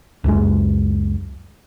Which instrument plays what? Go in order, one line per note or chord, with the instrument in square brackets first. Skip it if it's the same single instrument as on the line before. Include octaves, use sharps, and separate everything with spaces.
[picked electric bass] C#2 F#2 G#3